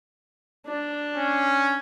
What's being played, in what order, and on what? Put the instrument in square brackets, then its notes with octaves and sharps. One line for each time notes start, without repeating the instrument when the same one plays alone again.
[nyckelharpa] D4
[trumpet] C#4